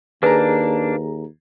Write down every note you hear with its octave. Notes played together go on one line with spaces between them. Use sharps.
D#2 A#3 D4 G#4 B4 A#5